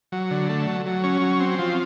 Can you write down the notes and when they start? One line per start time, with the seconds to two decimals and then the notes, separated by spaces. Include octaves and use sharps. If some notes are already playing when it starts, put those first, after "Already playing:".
0.12 F#3
0.31 D3
0.49 A3
0.67 F#3
0.86 F#3
1.04 C#4
1.21 F#3
1.40 C4
1.59 F3